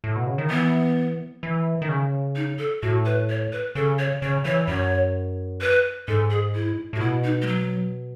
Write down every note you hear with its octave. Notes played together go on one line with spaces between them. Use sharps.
A2
B2
C#3
D#3
E3 B3
E3
D#3
C#3
D#4
A4
A2 F#4
B4
C#5
B4
C#3 A4
C#5
C#3 C#5
E3 C#5
F#2 C#5
B4
G#2 A4
G#4
E4
A2
F#4
B2 E4
D#4
G#3
F#3